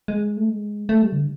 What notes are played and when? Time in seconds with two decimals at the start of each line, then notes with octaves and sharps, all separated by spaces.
0.08 G#3
0.37 A3
0.49 G#3
0.89 A3
1.02 G3
1.12 C#3
1.16 D3